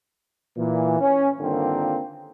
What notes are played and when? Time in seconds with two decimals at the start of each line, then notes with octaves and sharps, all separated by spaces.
0.57 A#2 E3
1.00 C#4
1.40 G2 D3 D#3 A#3 C4 F4